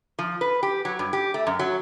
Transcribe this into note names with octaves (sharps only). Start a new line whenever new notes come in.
F3
B4
G4
F#3
G2
G4
A3
F#2
F#3